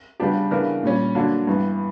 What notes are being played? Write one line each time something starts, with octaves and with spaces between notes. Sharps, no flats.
C#3 G3 B3 D4 G4
C#3 E3 B3 D4 A#4
A#2 G3 C#4
D3 F#3 A#3 D4
G2 E3 B3